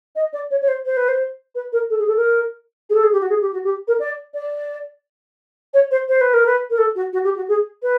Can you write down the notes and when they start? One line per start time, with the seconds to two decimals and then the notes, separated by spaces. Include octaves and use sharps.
0.15 D#5
0.33 D5
0.50 C#5
0.61 C#5
0.68 C5
0.85 C5
0.96 B4
1.08 C5
1.55 B4
1.72 A#4
1.90 A4
1.98 G#4
2.07 A4
2.16 A#4
2.89 G#4
2.94 A4
3.03 G#4
3.12 G4
3.21 F#4
3.29 G#4
3.41 G4
3.53 F#4
3.64 G4
3.87 A#4
3.99 D5
4.34 D5
5.73 C#5
5.91 C5
6.08 C5
6.21 B4
6.33 A#4
6.46 B4
6.70 A#4
6.78 A4
6.95 F#4
7.13 F#4
7.24 G4
7.36 F#4
7.48 G#4
7.82 B4